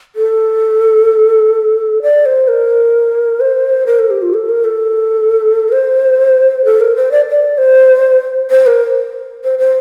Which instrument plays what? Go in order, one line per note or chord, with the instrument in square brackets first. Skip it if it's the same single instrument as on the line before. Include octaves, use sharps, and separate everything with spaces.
[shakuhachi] A4
D5
C5
A#4
C5
A#4
A4
G4
F4
A4
A#4
A4
A#4
C5
A4
A#4
C5
D5
D5
C5
C5
A#4
C5
C5